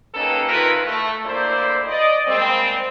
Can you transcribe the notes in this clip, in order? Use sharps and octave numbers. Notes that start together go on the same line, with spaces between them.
A#3 C#4 D#4 G4 A4 B4
C3 D#3 E4 F4 A#4 B4
A3
D2 A#3 E4 C5 D5
D5 D#5
G3 G#3 A#3 C4